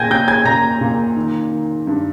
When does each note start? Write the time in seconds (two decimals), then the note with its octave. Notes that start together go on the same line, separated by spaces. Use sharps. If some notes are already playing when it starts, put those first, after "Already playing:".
Already playing: A#2 G5 G#5 G6 G#6 A#6
0.10 A#2 G5 G6
0.28 G#5 G#6
0.45 A#2 A#5 A#6
0.81 A#2
1.16 D#3
1.51 D#3
1.87 G2